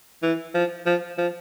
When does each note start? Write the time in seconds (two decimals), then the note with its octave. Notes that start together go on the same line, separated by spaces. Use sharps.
0.23 E3
0.54 F3
0.86 F3
1.18 F3